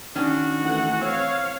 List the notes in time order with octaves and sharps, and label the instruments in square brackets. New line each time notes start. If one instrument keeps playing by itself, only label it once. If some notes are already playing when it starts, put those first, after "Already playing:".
[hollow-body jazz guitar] D#3 C#4 D4 [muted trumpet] F#4
[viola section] E3 A3 F#5
[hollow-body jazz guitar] C4 [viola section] C#5 F5